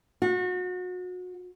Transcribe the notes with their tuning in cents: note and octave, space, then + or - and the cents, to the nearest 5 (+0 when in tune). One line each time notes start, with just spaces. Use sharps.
F#4 -30